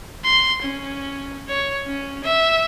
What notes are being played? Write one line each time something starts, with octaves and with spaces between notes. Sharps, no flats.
C6
C#4
C#5
C#4
E5